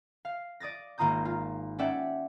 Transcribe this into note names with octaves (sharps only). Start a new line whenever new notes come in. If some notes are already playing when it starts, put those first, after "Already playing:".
F5
D5 D#6 A6 A#6
G#1 A#3 F4 A#5 D#6 G6
F4
C#4 D5 E5 F#5 G5